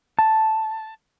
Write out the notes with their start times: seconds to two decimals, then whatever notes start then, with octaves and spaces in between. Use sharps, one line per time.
0.19 A5